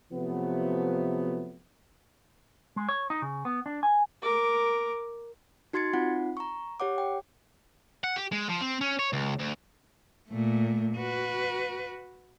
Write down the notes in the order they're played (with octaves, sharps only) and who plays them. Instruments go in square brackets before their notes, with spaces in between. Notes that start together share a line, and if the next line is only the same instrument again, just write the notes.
[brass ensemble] C3 F3 F#3 A3 B3
[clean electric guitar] G#3
C#5
D#4
C#3
B3
D4
G#5
[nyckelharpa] A#4 D6
[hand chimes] D#4 F#4 C6 G#6 A6 C#7
C4 D#4 F4 F#5
A#5 C#6
G4 C#5 F#5 D6
G5
[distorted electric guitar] F#5
G4
G#3
F3
C4
C#4
C#5
C#2
D2
[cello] A#2 A3
F#4 B4